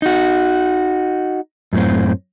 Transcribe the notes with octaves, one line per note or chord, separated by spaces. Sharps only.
D#4 F#4
F#2 A2 C4